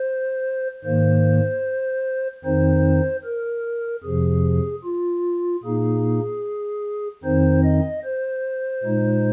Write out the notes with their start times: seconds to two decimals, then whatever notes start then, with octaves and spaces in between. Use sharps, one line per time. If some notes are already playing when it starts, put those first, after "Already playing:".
Already playing: C5
0.84 G#2 D#3 A#3 C5
2.44 F2 D#3 C4 D#4 C5
3.24 A#4
4.03 F2 C3 F3 G#4
4.84 F4
5.63 A#2 A#3 D#4 G#4
7.23 F2 D#3 C4 D#4 C5
7.64 D#5
8.04 C5
8.83 A#2 G#3 D#4